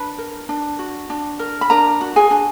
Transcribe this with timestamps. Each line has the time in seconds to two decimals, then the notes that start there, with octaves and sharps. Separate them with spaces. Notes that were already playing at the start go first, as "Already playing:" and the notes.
Already playing: D4 B4 B5
0.18 A#4
0.49 D4
0.79 F#4
1.10 D4
1.39 A#4
1.61 B5
1.70 D4 A#4 A#5
2.01 F#4
2.16 G#4 G#5
2.31 D4